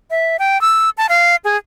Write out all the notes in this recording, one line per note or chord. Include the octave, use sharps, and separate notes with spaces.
E5
G5
E6
A5
F5
G#4